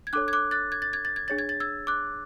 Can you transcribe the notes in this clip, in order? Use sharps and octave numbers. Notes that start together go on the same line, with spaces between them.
G#6
D4 A4 C#5 D6 F#6
G#6
D6 F#6
F#6 A6
G#6
A6
G#6
A6
G#6
D4 G#4 C#5 A6
G#6
A6
E6 G#6
D6 F#6